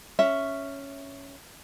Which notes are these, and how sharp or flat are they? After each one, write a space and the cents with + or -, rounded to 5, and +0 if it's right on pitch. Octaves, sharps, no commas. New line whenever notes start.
C#4 +0 E5 +0